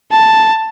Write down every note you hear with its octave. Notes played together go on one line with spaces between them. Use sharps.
A5